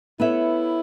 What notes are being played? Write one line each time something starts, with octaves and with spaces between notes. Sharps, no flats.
B3 E4 A4 C#5 E5